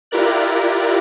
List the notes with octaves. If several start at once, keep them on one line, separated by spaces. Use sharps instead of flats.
E4 F4 G4 A#4 D5 F#6